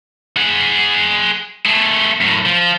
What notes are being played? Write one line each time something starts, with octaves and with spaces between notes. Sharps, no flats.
G#4 F#5
A3 G#4
F#2 A2
F3